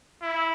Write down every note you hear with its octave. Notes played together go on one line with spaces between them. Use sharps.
E4